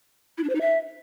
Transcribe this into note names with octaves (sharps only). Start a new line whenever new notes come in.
E4
D4
C5
D#4
E5